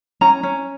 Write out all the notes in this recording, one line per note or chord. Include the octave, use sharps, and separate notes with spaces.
C#4 A#5
C#4